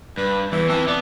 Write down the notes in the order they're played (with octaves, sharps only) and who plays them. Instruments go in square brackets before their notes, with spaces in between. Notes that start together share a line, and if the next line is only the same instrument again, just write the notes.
[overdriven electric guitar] G2 [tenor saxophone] B4
[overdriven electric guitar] E2 [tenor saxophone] E3
[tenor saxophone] E3 [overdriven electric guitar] C4 A5
[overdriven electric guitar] B3 [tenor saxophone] D5